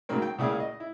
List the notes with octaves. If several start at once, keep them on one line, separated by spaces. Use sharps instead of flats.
G#2 C#3 F#3 A#3 C4
G5
C#2 A#2 C#3 E4 G#4 F5
D#5
E4